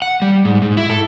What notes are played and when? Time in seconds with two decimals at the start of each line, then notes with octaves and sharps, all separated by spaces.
0.02 F#5
0.22 G3
0.45 G#2
0.62 G#2
0.77 E4
0.90 A4